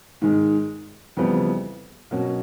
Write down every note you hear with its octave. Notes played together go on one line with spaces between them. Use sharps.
G#2 D#3 G#3
F2 C#3 E3 G3 B3
B2 F#3 A#3 C#4 F#4